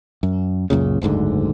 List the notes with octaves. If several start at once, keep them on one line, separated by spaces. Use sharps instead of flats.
F#2
C#2 F#2 A#2 C#3
F#1 D2 G#2 D3